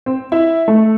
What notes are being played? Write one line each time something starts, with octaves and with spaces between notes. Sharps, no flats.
C4
E4
A3